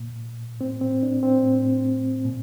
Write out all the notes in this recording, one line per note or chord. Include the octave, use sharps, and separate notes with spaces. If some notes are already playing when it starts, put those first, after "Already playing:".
Already playing: A#2
A2 C4
C4
D4
C4
A2
A#2